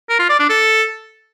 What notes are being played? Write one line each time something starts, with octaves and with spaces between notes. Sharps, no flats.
A#4
F4
D5
D4
A4